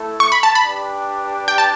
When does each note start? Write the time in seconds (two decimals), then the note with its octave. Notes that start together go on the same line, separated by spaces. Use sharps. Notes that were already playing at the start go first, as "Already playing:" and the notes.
Already playing: A3 E4 A4
0.20 C#6
0.32 B5
0.43 A5
0.55 B5
0.66 D4 G4 B4 D5
1.48 G5
1.58 A5